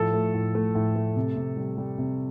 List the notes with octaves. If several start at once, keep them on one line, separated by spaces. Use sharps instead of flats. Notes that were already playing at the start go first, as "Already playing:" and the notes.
Already playing: A2 F3 A4
A3
A2
A3
A2
A3
C3
C3
G3
G3
C3